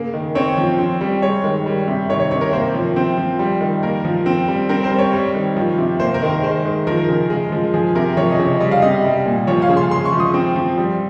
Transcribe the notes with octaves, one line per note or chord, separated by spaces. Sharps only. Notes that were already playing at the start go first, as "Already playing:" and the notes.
Already playing: C#3 A#3
D#3
C4 C#5
F3
C4
G3
G#3 C#5
D#3
G3
C3
D#3 C#5
C#5
C3 C#5
A#4
A#3 C5
F3
C4
F3
G3
D#3
A#3 A#4
F3
C4
G3
C4 A#4
C5
G3
C#5
G3
D#3
F3
C3
A#3 C5
A#4
D#3
A#4
G#3 C5
D#3
F3 A#4
C#3
G#3
F3
F3 G#4
C3 A#4
F3 C#5
D#5
C#3
C#5
G3 D#5
F5
C3 D#5
G3
A#2
F3 C#5
F5
C#3
C6
G#3 C6
C#6
F3
D#6
C4
F3
G3